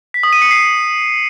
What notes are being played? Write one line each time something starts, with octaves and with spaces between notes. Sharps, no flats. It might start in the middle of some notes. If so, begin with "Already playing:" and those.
B6
D#6
D#7
C#7
C7